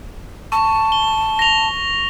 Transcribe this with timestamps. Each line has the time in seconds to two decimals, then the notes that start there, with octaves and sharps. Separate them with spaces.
0.52 A5 C#6
0.92 G7
1.39 A#6 F7